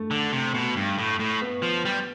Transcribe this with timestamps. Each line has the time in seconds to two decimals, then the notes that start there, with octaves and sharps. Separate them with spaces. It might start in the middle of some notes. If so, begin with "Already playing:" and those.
Already playing: A3
0.11 D3
0.32 C3
0.54 B2
0.76 G2
0.98 A2
1.19 A2
1.42 B3
1.62 F3
1.85 G3